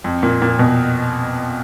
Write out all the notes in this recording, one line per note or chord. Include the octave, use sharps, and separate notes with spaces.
F2
A#2
A#2
B2